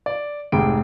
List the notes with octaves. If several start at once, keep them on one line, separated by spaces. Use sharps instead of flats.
D5
F1 G#2 G#4 G5 D6 D7